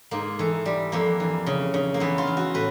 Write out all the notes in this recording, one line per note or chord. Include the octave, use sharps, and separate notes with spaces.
G#2 A#3
E3 A3
G3
F2 A#3
E3
C#3
C#3
A#3
E3 B3
F4
E3
F#4
A2 B4